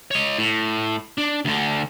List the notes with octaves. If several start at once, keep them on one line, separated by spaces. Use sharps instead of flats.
C#5 D#5
A2
D4
D2 D3